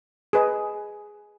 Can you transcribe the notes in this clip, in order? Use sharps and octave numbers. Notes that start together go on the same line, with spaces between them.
G#4 B4 D#5